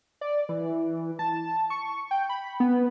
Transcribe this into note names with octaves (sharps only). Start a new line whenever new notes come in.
D5
E3
A5
C#6
G5
B5
B3